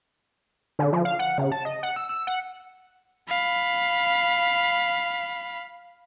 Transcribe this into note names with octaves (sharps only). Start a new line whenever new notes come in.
D3
F3
F5
F#5
C#3
A5
D#5
F#5
E6
E6
F#5
F5 B5